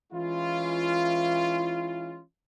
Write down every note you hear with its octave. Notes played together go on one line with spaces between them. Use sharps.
E3 G#3 C#4 E4 F4